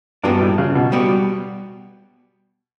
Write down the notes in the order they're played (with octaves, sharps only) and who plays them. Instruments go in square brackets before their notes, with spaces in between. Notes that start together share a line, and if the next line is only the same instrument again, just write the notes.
[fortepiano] G2 [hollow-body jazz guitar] G3 B3 F#4 B4 D5
[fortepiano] A2
C#3
B2
[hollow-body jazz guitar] G3 B3 F#4 B4 D5